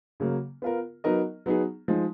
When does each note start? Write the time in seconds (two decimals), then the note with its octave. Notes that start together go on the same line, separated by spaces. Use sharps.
0.20 C#3 F#3 A#3
0.62 B3 F4 A#4
1.04 F#3 B3 D#4 A#4 D#5
1.46 F#3 B3 D#4 G#4
1.88 F3 G#3 D#4